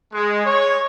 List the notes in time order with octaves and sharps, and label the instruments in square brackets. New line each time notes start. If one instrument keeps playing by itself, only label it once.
[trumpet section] G#3
C#5